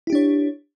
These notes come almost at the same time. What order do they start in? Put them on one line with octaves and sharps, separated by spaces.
E4 G4 D4 C#5